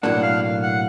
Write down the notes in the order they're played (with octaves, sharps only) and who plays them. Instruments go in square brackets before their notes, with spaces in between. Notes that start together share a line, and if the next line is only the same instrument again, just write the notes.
[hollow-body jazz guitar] B1 A2 F#3 A#3 D4 [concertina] F#5
[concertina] F5
F#5